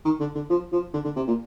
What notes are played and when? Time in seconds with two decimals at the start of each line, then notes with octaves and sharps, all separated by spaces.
0.05 D#3
0.20 D3
0.35 D3
0.50 F3
0.72 F3
0.94 D3
1.04 D3
1.16 C3
1.28 A#2